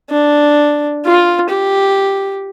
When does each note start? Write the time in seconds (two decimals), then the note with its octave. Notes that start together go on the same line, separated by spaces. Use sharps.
0.10 D4
1.06 F4
1.50 G4